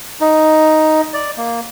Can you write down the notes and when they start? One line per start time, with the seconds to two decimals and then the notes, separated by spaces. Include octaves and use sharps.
0.21 D#4
1.14 D5
1.38 A#3